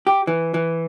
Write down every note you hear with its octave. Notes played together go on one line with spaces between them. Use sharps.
G4
E3
E3